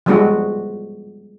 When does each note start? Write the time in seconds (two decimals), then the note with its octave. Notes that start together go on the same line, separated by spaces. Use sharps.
0.06 F3 G3 G#3 B3 D4 F#4